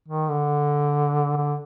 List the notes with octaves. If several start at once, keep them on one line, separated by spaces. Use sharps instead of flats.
D#3
D3
D3